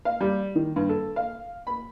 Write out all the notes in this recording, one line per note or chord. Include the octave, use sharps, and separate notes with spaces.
F5
G3
D#3
G2
A4
F5
B5